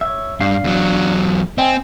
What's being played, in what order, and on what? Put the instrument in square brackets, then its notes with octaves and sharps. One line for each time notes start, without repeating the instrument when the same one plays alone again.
[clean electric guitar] C#5 E5
[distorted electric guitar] G2 [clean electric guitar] D4 F5
[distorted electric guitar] E2 F#3
[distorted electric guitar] C4 [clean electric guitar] D#5 G5 G#5